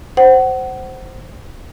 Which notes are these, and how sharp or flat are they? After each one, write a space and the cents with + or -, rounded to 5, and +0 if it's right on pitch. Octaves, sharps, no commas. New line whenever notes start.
C5 +0 F#5 +25